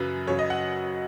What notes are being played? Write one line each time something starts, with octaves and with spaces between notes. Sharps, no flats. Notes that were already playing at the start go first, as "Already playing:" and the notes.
Already playing: F#2 C#3 F#3 B4
F#2 C#3 F#3 C#5
D#5
F#5